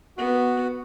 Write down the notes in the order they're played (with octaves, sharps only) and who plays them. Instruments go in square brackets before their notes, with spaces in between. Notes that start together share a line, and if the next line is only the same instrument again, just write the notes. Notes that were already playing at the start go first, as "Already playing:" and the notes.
[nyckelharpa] B3 [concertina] F#4